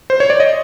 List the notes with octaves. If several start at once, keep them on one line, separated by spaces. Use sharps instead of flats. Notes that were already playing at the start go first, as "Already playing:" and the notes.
C5
C#5
D5
D#5